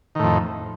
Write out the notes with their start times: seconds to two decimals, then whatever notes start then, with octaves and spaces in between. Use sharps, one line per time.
0.15 D#3
0.19 A2
0.23 F2